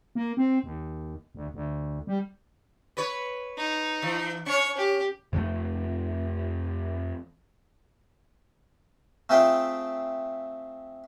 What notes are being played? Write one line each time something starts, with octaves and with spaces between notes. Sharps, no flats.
A#3
C4
D#2
D2
D2
G3
B4 C#5
D#4
E3
C#4 C#5 C#6
G4
F2 F3 G#3 A3
A3 C4 F4 G#4 E5 G5